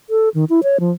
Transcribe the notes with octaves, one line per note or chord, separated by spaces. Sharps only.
A4
D#3
E4
C#5
F3